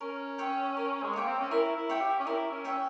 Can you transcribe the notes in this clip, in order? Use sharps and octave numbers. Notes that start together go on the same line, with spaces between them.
C#4 A#4
C#5 E5 G5
A#4
G#3
A#3 C#5 E5 G5
C4
C#4
E4 A#4
E4
C#5 E5 G5
G4
C#4
E4 A#4
C#4
C#4 C#5 E5 G5